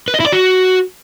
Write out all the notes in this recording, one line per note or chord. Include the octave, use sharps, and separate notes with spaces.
B4
D#5
E4
D5
F#4